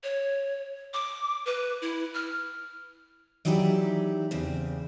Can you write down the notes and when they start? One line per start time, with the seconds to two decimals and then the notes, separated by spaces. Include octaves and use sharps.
0.04 C#5
0.94 D6
1.46 B4
1.82 E4
2.14 F6
3.45 E3 F#3 D#4 E4 G4 D5
4.31 E2 C#3 C4